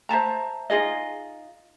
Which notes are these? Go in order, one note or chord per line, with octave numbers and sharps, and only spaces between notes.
C5 E5 A5 A#5
D#4 F4 G#4 D#5